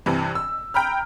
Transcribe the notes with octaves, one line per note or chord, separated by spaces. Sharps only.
G2 C3 E3
E6
G5 A#5 B5 F6